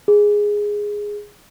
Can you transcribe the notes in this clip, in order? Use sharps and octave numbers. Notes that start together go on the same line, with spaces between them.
G#4